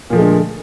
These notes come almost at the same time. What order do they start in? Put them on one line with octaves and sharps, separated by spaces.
A#2 F3 A3 G#3 D3